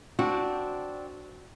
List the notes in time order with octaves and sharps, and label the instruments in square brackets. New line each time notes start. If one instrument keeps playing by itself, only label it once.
[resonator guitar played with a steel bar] C4 D4 [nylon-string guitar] F#4